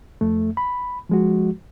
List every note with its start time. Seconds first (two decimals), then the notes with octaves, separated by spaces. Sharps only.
0.21 F2 A3
0.57 B5
1.09 F3 G#3 F#4